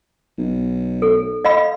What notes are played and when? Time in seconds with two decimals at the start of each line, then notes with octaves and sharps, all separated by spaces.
0.38 B1
1.02 A4
1.45 D#5 F5 B5